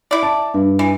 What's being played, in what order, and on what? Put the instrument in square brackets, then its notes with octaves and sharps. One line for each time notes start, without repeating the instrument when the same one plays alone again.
[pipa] E4 D5
[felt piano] A5
G2
[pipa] E3